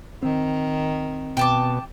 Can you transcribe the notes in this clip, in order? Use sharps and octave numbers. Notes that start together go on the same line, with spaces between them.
D#3 C4
B2 G5 A5 D6